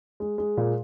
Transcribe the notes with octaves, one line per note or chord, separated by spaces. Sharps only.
G#3
G#3
A#2